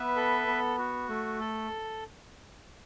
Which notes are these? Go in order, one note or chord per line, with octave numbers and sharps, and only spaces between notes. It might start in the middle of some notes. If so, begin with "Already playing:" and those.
Already playing: B3 B4 E5
A4
B3
F#4
A3
A4